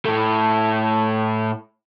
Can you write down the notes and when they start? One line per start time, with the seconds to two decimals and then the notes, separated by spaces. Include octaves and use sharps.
0.06 A2 A3